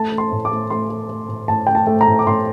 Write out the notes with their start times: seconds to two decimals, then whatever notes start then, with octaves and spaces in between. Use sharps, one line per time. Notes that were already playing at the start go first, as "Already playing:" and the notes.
Already playing: A3 A5
0.12 A3
0.18 C6
0.32 A2
0.45 D6
0.51 A3
0.70 A3 C6
0.90 A3
1.09 A3
1.29 A2
1.48 A2 A5
1.67 A3 G5
1.75 A5
1.87 A3
2.01 A#5
2.07 A2
2.19 D6
2.27 A2 C6